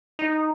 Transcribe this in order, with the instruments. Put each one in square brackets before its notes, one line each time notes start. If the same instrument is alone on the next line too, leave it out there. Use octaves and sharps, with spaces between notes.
[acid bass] D#4